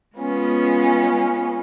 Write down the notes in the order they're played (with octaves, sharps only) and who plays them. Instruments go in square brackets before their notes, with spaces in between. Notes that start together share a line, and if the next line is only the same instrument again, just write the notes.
[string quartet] G#3 B3 C#4 F4